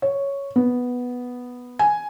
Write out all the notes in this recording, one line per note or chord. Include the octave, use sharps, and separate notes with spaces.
C#5
B3
G#5